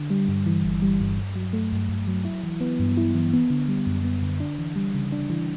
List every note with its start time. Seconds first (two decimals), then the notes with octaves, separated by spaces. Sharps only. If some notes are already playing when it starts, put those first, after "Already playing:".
Already playing: D3
0.10 G3
0.28 G2
0.47 E3
0.65 G1
0.82 G3
1.00 G2
1.18 G2
1.36 F#3
1.53 A3
1.72 G2
1.89 G2
2.07 F#3
2.25 E4
2.44 E3
2.61 B3
2.79 G2
2.97 E4
3.15 E3
3.33 B3
3.50 D3
3.68 G3
3.87 F#2
4.04 B3
4.23 D3
4.40 D4
4.58 E3
4.76 G3
4.95 C#3
5.12 D4
5.30 E3